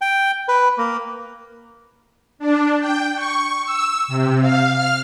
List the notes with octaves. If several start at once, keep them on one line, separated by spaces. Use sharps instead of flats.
G5
B4
A#3
D4
G5
C#6
E6
C3
F5
F6